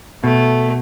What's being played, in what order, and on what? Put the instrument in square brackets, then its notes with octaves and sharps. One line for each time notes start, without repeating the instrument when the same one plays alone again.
[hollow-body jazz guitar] B2 [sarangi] A3